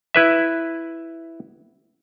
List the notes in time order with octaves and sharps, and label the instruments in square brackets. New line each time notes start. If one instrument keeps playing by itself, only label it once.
[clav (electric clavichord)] E4 B4 E5